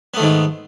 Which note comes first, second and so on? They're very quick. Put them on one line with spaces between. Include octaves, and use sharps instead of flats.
B3 A3 D#3 G#2